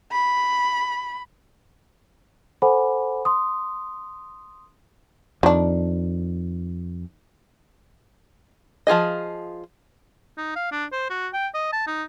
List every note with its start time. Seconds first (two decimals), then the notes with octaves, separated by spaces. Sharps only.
0.11 B5
2.62 A4 C5 F#5 G#5 B5 D6
3.25 C6 D#6
5.43 F2 D#3 D4
8.87 F3 F4 G#4 D#5
10.38 D#4
10.56 F5
10.72 D4
10.92 C5
11.10 F#4
11.34 G5
11.54 D#5
11.73 A5
11.87 D#4